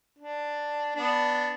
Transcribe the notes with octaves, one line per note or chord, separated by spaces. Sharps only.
D4
B3 D4